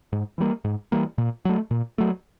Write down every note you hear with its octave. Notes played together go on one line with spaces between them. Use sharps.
G#2
E3 G3 A#3
G#2
E3 G3 A#3
A#2
F#3 A3
A#2
F#3 A3